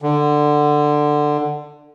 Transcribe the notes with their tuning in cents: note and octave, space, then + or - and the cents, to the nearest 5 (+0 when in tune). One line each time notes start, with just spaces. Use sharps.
D3 +15